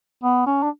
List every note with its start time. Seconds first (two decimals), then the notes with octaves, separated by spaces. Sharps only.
0.24 B3
0.47 C#4
0.63 D4